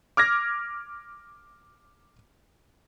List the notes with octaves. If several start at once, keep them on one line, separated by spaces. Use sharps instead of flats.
D6 F6 G#6 A#6